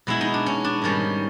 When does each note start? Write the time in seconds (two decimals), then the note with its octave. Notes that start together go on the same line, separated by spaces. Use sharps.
0.07 B2 G#3 B3 E4
0.21 D#4
0.34 D4
0.46 C#4
0.64 D4
0.82 G#2 D#3 G3 C#4